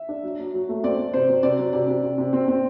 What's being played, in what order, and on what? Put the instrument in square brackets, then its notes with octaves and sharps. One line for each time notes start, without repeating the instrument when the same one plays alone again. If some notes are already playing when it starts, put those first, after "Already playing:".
Already playing: [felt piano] E5
[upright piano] D4
F#3
F#3
F#3
A3
[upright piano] C4 [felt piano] D5
[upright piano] C4
[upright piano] C3 [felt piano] C5
[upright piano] F#3
[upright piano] C3 [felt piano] D5
[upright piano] F#3
[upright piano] C3 [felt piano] D5
[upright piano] C3
C3
C3
C4
C4